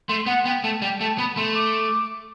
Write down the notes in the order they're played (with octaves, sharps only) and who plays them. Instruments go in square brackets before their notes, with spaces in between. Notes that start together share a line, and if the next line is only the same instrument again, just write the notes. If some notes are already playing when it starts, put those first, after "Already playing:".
[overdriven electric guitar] A3 [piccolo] C6
[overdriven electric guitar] B3 [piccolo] F#5
[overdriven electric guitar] B3 [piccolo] G5
[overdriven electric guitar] A3 [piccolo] A5
[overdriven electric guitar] G3 [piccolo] G5
[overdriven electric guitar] A3 [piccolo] A5
[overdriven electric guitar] B3 [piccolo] B5
[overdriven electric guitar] A3 [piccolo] C6
[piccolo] D6